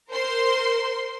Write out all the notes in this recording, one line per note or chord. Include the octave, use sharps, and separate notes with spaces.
A#4 C5 C6